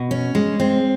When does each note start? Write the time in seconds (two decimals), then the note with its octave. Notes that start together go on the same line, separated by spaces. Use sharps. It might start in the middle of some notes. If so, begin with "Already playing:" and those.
Already playing: B2
0.11 C#4
0.35 G#3
0.60 C4